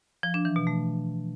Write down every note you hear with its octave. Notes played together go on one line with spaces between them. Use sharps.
F3
D4
E3
B2
A3